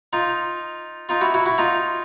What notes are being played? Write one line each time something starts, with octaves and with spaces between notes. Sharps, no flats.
D#4 F4
D#4 F4
E4 F#4
E4 F#4
E4 F#4
D#4 F4